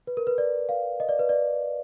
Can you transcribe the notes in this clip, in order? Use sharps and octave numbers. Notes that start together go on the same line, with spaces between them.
B4
A#4
B4
D5
F5
D#5
D5
B4
D5